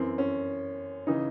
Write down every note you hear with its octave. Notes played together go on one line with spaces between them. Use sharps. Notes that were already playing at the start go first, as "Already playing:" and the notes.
Already playing: F#2 E3 C4
C#4
C#3 E3 D#4